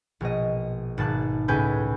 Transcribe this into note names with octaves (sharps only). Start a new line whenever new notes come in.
A#1 B2 D#5
G#1 B2 A5 F#6
C#2 A2 C#4 B4 G#5 G6